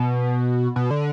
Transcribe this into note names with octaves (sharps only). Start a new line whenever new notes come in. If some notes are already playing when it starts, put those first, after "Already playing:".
Already playing: B2
B2
D3